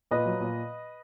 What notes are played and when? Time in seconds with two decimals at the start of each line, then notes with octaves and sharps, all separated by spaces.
0.11 A#2 B4 D#5
0.26 F#3
0.40 A#2